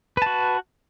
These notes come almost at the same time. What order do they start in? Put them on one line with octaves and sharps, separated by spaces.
B4 A5 F#4